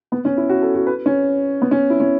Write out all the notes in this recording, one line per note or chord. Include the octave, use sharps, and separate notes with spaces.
B3
C#4
E4
F#4
A4
F#4
B4
C#4
B3
C#4
E4
C#4